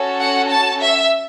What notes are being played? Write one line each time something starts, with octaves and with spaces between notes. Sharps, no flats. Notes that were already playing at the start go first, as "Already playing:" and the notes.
Already playing: C#4 F#4 A4
F#5
A5
E5